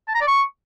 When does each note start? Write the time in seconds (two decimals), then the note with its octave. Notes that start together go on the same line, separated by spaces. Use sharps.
0.08 A5
0.15 A#5
0.21 D5
0.28 C#6